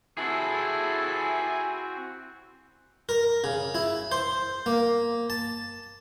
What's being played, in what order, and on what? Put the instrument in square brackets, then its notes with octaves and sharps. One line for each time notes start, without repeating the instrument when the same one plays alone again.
[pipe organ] C4 F#4 [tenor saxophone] E4 [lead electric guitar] G#4 A4
[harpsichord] A#4
C#3
E4
C5
A#3
A5